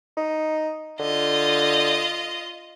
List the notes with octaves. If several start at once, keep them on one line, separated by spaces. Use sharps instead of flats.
D#4
D3 F4 D#5